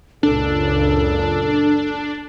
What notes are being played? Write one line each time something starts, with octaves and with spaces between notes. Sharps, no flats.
F#1 C#2 A#2 D4 A4